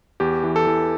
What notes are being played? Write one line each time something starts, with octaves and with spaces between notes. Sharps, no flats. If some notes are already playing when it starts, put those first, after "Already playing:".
E2 G4
E3
A4
E3